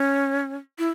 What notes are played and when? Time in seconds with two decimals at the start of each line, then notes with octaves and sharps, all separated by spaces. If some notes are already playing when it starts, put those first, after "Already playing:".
Already playing: C#4
0.79 E4